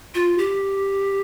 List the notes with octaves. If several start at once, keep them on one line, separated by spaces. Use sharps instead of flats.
F4
G4